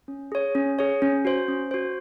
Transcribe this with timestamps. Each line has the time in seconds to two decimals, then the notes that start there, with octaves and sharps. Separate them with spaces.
0.08 C#4
0.32 G#4 C#5
0.55 C#4
0.79 G#4 C#5
1.02 C#4
1.25 F#4 C5
1.48 C#4
1.71 F#4 C5